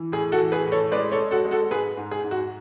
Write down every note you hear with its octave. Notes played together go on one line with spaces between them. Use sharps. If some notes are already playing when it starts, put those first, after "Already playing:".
Already playing: E3
A2 G#4
F#4 A4
E3
G#4 B4
A2
A4 C#5
G#3 B4 D5
A4 C#5
G#3
F#4 A4
G#3
F#4 A4
G#2 G#4 B4
G#2
G#4
G#2
F#4